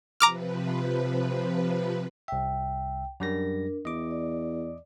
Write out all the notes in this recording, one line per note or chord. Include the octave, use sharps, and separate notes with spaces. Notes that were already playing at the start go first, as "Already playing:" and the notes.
C3 F3 B4 A#5 D6 F6
C2 E5 G5
F#2 G3 D4 A#4 A#6
E2 D#5 D6
D5